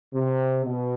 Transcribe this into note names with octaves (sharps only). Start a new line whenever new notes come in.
C3
B2